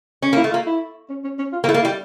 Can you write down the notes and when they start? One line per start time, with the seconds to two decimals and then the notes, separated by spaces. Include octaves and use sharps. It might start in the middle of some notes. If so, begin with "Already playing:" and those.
0.22 C#4
0.33 A#3 E4
0.44 A3
0.51 F4
0.54 A#3
0.66 E4
1.10 C#4
1.24 C#4
1.38 C#4
1.52 F4
1.64 A#3
1.67 A3 E4
1.74 A#3
1.82 E4
1.85 G3